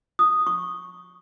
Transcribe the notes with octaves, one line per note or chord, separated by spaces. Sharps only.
D#6
C#6